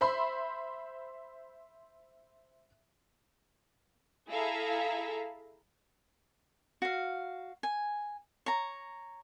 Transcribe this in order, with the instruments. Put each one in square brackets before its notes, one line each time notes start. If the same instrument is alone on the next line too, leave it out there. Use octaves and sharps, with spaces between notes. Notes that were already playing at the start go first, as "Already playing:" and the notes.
[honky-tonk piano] C5 E5 B5 C6
[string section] E4 G#4 A4 E5 F5 A#5
[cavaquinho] F#4 F5
G#5
C#5 A#5